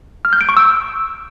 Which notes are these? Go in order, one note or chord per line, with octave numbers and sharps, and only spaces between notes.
F6
G6
D7
C#6
E6